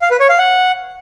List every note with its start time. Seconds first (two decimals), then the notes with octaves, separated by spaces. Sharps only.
0.02 F5
0.11 B4
0.20 C#5
0.29 F5
0.38 F#5